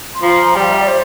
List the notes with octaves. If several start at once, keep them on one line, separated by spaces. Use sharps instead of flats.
C6
F3 A#5
G3 G5
F5
E5
D5
C5